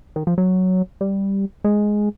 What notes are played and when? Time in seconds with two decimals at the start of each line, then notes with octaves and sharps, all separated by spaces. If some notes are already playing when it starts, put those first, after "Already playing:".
0.16 D#3
0.27 F3
0.38 F#3
1.01 G3
1.64 G#3